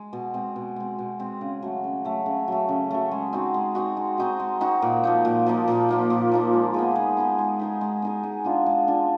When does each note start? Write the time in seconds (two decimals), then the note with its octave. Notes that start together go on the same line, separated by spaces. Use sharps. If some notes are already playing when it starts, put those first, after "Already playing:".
Already playing: G#3
0.13 B2
0.34 G#3 C4
0.56 B2
0.76 G#3 C4
0.99 B2
1.19 G#3 C4
1.41 C#3
1.62 F#3 A3
1.84 C#3
2.05 F#3 A3
2.26 C#3
2.48 F#3 A3
2.69 C#3
2.91 F#3 A3
3.12 G#3
3.33 C4 D#4 F#4
3.54 G#3
3.75 C4 D#4 F#4
3.97 G#3
4.18 C4 D#4 F#4
4.40 G#3
4.60 C4 D#4 F#4
4.82 A#2
5.04 F3 A#3 D#4
5.25 A#2
5.46 F3 A#3 D#4
5.68 A#2
5.89 F3 A#3 D#4
6.10 A#2
6.32 F3 A#3 D#4
6.53 G#3
6.74 B3 D#4 G#4
6.96 G#3
7.17 B3 D#4 G#4
7.38 G#3
7.59 B3 D#4 G#4
7.81 G#3
8.02 B3 D#4 G#4
8.23 G#3
8.44 B3 D4 F4
8.66 G#3
8.87 B3 D4 F4